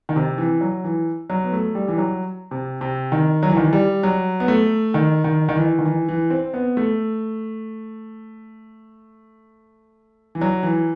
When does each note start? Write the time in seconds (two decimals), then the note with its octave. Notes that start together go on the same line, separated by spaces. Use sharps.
0.09 D#3
0.16 C3
0.38 E3
0.61 F#3
0.84 E3
1.30 F#3
1.44 B3
1.52 A3
1.75 G3
1.88 E3
1.98 F#3
2.51 C3
2.81 C3
3.12 D#3
3.43 F#3
3.49 E3
3.57 D#3
3.64 E3
3.73 G3
4.03 F#3
4.40 B3
4.48 A3
4.94 D#3
5.24 D#3
5.49 D#3
5.55 E3
5.79 D#3
5.85 E3
6.08 E3
6.30 C4
6.54 B3
6.77 A3
10.35 E3
10.41 F#3
10.63 E3